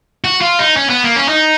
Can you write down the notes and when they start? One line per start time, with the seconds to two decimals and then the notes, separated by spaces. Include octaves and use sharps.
0.24 F#4
0.41 F4
0.59 D#4
0.77 C#4
0.89 B3
1.03 A#3
1.16 C#4
1.29 D#4